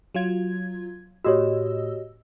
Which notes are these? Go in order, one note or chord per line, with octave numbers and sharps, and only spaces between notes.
F#3 F4 G#6
A2 F#4 G4 C#5 D#5 E6